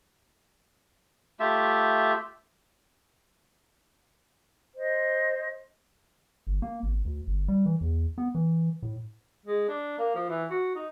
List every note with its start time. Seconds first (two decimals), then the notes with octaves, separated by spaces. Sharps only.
1.40 A3 F4 G4 E5
4.76 C5 D#5
6.47 G1
6.62 A#3
6.83 G#1
7.05 D2
7.27 G1
7.48 G3
7.66 E3
7.81 E2
8.18 B3
8.35 E3
8.82 A2
9.46 G#3
9.68 D4
9.99 A#3
10.15 F3
10.29 E3
10.50 F#4
10.75 D#4